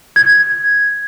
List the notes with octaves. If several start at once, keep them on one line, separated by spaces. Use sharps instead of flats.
G#6